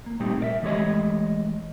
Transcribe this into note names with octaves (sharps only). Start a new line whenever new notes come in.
A#3
A#2 G3 A3 C4 D#4 G4
A#4 D5 E5
E3 G#3 A3 G4 C#5 D#5